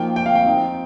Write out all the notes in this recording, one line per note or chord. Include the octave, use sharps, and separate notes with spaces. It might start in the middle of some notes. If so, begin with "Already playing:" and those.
Already playing: F3 A#3 D#4 G5
G5
F5
G5
F3 C4 D#4